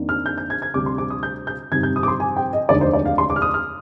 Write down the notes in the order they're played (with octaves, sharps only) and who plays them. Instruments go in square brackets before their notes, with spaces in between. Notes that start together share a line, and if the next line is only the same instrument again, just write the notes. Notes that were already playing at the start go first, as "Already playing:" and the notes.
Already playing: [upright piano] F2 D#3 A#3 D4
F6
G6
G6
G#6
G#6
D2 C3 G3 D4 D6
C6
D6
D#6
G6
G6
G1 F2 C3 D#3 G3 G#6
G6
D#6
D6
C6
G#5
G5
D#5
F1 D#2 D3 G#3 D4 D5
C5
D5
F5
C6
D6
F6
D#6
F6